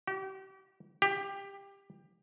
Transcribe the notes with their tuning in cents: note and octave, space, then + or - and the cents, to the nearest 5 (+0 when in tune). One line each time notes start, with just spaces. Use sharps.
G4 -35
G4 +15